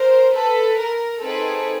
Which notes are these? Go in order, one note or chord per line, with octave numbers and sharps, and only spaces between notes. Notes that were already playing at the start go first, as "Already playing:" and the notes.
Already playing: A#4 C5
A4 B4
A#4
C4 D#4 G#4 A4 B4